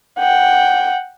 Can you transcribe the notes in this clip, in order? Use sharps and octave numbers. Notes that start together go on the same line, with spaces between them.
F#5 G5